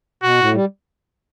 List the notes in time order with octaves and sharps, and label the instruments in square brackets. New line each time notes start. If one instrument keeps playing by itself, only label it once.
[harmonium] B2 [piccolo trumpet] F#4
[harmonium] A2
G3